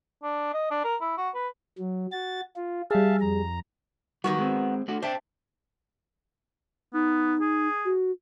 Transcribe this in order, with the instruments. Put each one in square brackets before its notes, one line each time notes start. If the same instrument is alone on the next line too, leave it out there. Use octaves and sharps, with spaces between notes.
[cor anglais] D4
D#5
D4
A#4
E4
F#4
B4
[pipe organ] F#3
F#4 A6
F4
[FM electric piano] G3 G#4 [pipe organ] E5 F5 A5
[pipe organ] F2 A#5
[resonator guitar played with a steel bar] D#3 B3 F#4 [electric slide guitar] G3
[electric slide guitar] G#3 C4
A3 D4 F#4
[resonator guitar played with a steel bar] D4 [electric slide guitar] C5 E5 G5
[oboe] B3 [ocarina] D#4
[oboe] G#4
[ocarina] F#4